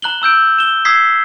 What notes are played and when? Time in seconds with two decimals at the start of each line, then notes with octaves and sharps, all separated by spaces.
0.02 A#5 F#6 F#7 G7
0.22 A#5 E6 G6 D7
0.58 E7 G7
0.85 D#6 E6 G#6 B6 C7